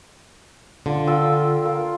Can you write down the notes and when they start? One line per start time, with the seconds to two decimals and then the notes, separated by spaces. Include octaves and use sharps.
0.86 D3 F4
1.07 F4 G5 E6
1.65 A#3 F4